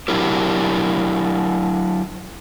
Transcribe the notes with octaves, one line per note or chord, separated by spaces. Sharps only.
F#3 D4 E4 G4 A#4